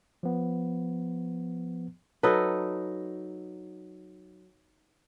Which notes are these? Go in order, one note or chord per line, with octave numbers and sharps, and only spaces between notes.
F3 B3
F#3 D#4 A4 B4